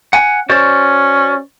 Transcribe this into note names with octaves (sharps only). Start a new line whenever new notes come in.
F#5 G#5
C#4 F#4 C5 D5